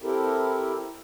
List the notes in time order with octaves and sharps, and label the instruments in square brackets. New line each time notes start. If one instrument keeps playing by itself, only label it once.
[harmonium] C4 E4 G4 A4 A#4